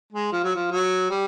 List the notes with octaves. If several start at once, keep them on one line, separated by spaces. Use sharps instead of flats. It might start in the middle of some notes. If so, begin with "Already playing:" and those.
G#3
F3
F#3
F3
F#3
G3